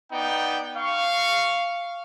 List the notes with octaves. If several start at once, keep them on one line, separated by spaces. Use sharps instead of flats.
B3 D#4 D5 G5
F5 C#6